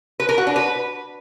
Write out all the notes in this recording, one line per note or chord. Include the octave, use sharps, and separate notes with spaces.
B4
A#4
F#4
D4
B4